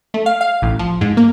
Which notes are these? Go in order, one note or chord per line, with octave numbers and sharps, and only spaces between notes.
A3
F5
F5
A1
F3
G#2
A#3